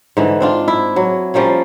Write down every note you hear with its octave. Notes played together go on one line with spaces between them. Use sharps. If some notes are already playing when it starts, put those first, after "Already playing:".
G#2 D3 E3
C4 D4 F4
E4
F#3
F3 G3 A#3 C#4